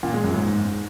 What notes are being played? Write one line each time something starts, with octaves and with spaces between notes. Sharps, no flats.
A#2
G#3
F#2
G#2